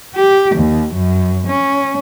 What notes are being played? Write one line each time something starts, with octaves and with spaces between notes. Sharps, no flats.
G4
D#2
F#2
C#4